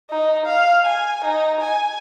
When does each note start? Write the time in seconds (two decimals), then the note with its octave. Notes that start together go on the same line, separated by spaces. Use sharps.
0.10 D#4
0.46 F5
0.86 G#5
1.24 D#4
1.61 G#5